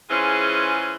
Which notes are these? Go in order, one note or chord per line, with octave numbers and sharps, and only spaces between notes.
E3 G#3 C#4 F4 G#4 C5